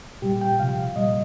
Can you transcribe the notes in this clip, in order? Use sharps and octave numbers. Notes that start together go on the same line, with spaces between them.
A#2 G3 G4
G5
C3 F3 F5
A#2 G3 D#5